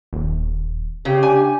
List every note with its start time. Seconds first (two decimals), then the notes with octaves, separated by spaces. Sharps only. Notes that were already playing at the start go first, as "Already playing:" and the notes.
0.13 D#1
1.05 C#3 G4
1.23 D4 G#5